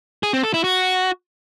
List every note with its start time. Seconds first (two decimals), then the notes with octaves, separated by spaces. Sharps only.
0.23 G#4
0.33 C4
0.43 A4
0.54 E4
0.64 F#4